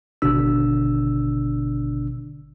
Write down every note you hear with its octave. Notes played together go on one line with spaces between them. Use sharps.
G#1 B2 D3 D4 E6